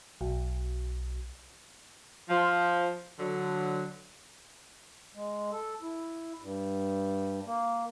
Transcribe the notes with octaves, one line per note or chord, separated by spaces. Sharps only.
B1
F3
D3 F#3
G#3
A4
E4
G2
A#3